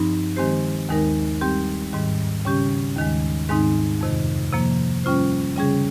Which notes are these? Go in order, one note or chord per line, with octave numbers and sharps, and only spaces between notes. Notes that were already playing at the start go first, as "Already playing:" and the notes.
Already playing: G2 F3 C4 D#4
D#3 G#3 C4 G4 C5
D#2 D#3 G#3 D#4 A#4
G3 C4 G4
G#2 D#3 G3
C#3 G3 C#4 G4
D#2 D#3 G#3
G#2 D#3 G#3 C4 D#4
F2 C3 D#3
C3 F3 A#3
G3 C#4 F4 C5
C#3 G3 C#4 G#4